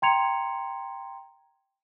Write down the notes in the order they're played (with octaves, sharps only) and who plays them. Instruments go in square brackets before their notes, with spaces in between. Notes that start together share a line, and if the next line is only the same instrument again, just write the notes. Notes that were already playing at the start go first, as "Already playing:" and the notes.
[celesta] G5 A#5 C6 G#6 C#7 F7